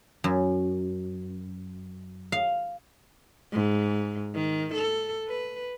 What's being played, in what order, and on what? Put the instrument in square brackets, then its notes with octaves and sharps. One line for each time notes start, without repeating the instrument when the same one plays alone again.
[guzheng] F#2
F5
[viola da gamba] G#2
D#3
A4
B4